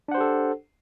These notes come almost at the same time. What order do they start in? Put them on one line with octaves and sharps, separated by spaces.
D4 F#5 C5 G4 A4